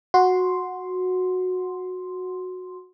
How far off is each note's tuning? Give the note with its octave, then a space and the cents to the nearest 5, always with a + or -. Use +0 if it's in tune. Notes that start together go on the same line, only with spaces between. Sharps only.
F#4 -10 C6 +0